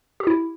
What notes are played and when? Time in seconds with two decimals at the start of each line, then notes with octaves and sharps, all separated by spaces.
0.20 G4
0.27 E4